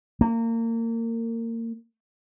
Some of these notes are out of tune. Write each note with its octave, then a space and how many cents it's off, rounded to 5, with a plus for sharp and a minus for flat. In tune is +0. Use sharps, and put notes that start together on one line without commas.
A#3 -30